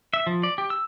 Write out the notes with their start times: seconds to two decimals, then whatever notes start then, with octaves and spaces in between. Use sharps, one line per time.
0.14 E5
0.27 F3
0.43 D5
0.58 G4
0.70 E6